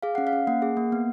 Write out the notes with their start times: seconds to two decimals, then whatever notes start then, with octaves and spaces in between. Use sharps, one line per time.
0.03 G#4 F5
0.15 C#4 F#5
0.27 F5
0.33 C#4
0.47 A#3 F#5
0.62 G#4
0.77 A#3
0.92 B3